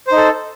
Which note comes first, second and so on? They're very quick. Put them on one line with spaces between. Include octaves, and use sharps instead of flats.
C5 D#4 A4